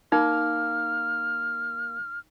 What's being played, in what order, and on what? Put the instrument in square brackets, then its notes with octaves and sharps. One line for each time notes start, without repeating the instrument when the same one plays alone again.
[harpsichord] A#3 [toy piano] D#4 [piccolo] F6